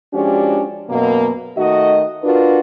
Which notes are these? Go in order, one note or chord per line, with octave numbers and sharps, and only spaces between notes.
F3 G#3 C#4 D4 F#4 G4
F#2 B2 A#3
D#3 A3 F#4 D#5
D4 F4 F#4 A#4 B4